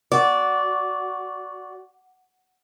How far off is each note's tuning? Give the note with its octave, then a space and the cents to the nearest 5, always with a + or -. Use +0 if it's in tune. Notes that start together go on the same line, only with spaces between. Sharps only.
F#4 +0 D5 -15